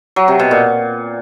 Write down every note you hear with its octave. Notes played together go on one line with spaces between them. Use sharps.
F#3
C3
B2
A#2